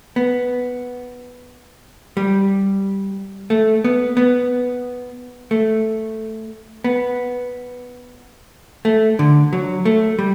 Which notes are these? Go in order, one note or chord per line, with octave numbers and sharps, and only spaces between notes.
B3
G3
A3
B3
B3
A3
B3
A3
D3
F#3
A3
G3